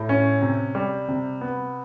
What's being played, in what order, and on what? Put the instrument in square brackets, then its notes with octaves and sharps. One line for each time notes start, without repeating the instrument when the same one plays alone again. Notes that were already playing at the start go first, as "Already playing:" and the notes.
Already playing: [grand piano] A2
C#4
C3
G3
C3
B3